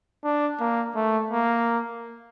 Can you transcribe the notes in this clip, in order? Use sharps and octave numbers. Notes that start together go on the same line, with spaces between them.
D4
A#3
A3
A#3